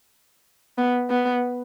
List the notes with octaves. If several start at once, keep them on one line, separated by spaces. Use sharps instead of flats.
B3
B3